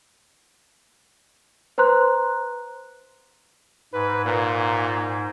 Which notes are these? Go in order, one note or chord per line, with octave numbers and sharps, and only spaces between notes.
B4 C5 A#5 C6 F#6
G#2 B4
A#2